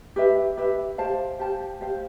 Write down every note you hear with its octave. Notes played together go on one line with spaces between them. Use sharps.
G4 B4 E5
G4 B4 E5
G4 C5 F5 A5
G4 C5 F5 A5
G4 C5 F5